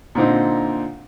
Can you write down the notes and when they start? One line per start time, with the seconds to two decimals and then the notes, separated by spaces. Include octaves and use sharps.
0.15 A#2 D3 C4 D#4